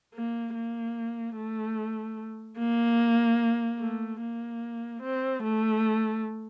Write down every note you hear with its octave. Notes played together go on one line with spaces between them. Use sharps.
A#3
A#3
A3
A#3
A3
A#3
C4
A3